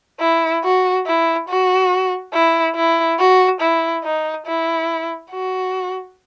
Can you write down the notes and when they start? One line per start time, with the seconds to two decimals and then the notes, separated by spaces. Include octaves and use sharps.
0.20 E4
0.64 F#4
1.06 E4
1.48 F#4
2.33 E4
2.75 E4
3.19 F#4
3.61 E4
4.04 D#4
4.46 E4
5.31 F#4